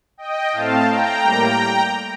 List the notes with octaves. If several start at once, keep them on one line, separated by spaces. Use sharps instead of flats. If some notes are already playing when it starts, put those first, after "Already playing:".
D#5 G5
A2 A3 C4 F5 A5
G5 A#5
A2 G3 A#3